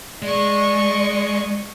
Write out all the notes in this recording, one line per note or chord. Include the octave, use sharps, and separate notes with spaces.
G#3 D5 D#5 C#6